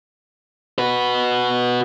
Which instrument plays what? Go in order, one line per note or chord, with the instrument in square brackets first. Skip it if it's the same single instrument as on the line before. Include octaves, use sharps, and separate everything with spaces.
[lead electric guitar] F#4 B4